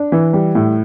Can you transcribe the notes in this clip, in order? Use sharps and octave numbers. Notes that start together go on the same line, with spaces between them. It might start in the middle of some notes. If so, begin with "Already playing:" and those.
Already playing: D4
E3
G3
A2